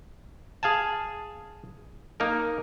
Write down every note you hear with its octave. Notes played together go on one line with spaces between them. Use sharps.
G#4 F5 G#5 A5
A#3 D#4 A#4